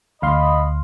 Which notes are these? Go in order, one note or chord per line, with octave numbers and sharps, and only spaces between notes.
D2 D#5 F5 B5 C6